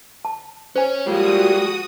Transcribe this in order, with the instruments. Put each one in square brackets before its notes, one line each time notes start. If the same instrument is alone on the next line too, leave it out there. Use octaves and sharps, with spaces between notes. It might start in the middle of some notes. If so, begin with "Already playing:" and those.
[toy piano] A5
[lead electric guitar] C#4 [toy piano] C5 G#5
[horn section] A#2 F3 G3 [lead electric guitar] G#3 [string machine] F#4 D#6